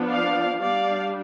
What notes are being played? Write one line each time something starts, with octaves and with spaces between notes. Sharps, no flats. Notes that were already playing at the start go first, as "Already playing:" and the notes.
Already playing: F3 B3 D4
D5 F5
G3 D4 D5 F5